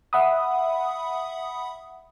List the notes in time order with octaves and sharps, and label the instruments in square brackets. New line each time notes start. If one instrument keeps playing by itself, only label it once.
[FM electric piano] E5 F#5 B5 D#6